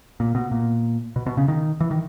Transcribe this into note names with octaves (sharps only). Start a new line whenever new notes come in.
A#2
B2
A#2
B2
B2
C#3
D#3
E3
D#3